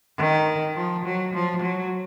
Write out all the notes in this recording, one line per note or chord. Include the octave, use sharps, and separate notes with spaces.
D#3
F3
F#3
F3
F#3